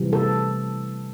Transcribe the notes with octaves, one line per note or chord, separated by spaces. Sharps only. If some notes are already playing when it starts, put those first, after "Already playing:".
Already playing: C3 E3 G3
A4